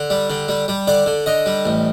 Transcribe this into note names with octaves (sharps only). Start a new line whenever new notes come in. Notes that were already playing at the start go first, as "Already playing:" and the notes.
Already playing: D3
G3
D3
G3
G3
D3 D5
D3
D3 D#5
G3
A1